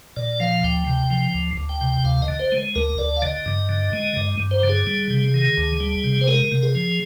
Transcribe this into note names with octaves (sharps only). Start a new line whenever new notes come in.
A#2 D5
F3 F5
D2 G5
C3
F3
D2
D2
G5
C3
D2 F5
D#5
D3
C5
G#3
D2 A#4
D2 D5
F5
D3 D#5
G2
D3
G#3
G2
G2
C5
D3
G#4
G3
C3
D#3
D2
G3
C3
C5
G#3 A#4
C3
G#4
F3